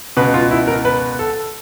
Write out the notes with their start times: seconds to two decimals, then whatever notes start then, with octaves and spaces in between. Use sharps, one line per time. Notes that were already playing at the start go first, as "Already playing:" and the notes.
0.17 C#2 B2 B4
0.34 F4
0.51 E4
0.68 A#4
0.85 B4
1.19 A4